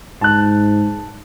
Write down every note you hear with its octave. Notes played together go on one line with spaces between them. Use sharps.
G#2 A5 F#6